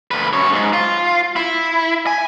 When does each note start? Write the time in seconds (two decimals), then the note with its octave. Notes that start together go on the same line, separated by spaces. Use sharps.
0.11 D2 B4
0.33 F#2 C#5
0.53 G#2
0.73 F4
1.36 E4
2.07 G#5